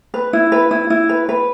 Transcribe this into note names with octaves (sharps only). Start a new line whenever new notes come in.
B4
E4
B4
E4
E4
B4
B4